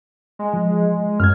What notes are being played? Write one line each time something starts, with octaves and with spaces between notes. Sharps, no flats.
G#3
F3
F#2 F6 G#6